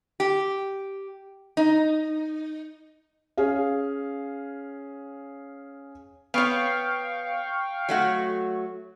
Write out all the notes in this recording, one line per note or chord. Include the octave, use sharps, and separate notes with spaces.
G4
D#4
C#4 G#4 F5
B3 C#5 F5 G5 C#6
F#3 A3 F#4